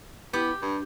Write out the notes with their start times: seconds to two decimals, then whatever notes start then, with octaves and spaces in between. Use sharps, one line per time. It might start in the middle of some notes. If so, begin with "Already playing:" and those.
0.33 B3 E4 G4
0.62 G2 D4